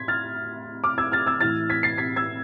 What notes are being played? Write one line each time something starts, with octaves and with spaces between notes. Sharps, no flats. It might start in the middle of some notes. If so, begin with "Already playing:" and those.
Already playing: A2 C6 G#6 B6
F6 A6
D6 F6
E6 G#6
F6 A6
E6 G#6
A2 E3 F6 A6
G#6 B6
A6 C7
G#6 B6
E6 G#6